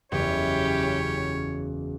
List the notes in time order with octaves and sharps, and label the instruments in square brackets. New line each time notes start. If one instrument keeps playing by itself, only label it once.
[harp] F#1 E2 D#5 [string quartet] C#4 E4 G4 [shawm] C#5